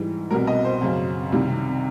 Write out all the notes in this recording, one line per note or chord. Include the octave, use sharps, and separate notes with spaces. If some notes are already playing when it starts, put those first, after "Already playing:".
Already playing: G#2 E3 G3
C2 B2 G3 A#4
D#5
C5
F#2 C#3 F#3
C2 C3 D#3 G3